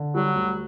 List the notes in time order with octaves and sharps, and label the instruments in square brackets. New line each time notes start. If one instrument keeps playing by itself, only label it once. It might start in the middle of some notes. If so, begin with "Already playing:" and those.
Already playing: [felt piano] D3
[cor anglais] F#3 [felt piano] G3
[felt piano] D2